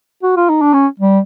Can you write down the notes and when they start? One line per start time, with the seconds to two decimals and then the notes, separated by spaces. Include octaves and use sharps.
0.23 F#4
0.36 F4
0.49 D#4
0.61 D4
0.74 C#4
0.99 G3